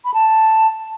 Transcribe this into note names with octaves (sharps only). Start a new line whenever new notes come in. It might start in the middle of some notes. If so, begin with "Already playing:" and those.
B5
A5